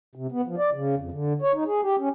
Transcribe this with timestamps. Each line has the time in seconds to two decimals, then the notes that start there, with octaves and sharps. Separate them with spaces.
0.15 C3
0.32 B3
0.47 F3
0.58 D5
0.73 C#3
0.98 F2
1.11 D3
1.42 C#5
1.54 D#4
1.66 G#4
1.83 G4
1.99 C#4